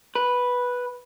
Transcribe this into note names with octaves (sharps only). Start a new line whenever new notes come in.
B4